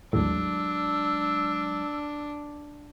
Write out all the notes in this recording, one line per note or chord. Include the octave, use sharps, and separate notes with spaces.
A1 D#2 A2 F#3 G#3 D4 E6